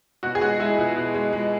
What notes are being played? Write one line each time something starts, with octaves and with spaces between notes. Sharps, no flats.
B2 F#4
G#4
G#3 F#4
G#3 E4
B2
B2
G#3
G#3